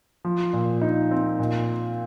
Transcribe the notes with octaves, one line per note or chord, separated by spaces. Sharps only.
F3
A#2
D#4
C4
A#2